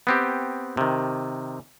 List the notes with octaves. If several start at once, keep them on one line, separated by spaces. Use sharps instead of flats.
B3 C4 G4
C3 D#3